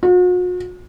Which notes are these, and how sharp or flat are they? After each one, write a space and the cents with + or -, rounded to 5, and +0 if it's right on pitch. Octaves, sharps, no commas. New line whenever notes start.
F#4 -45